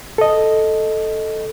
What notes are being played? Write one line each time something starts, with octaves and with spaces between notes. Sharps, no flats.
A4 D#5